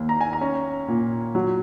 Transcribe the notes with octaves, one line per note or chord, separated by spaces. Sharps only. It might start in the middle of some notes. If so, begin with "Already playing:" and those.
Already playing: D#2
A#5
G#5
A#5
C#4
A#2
F#3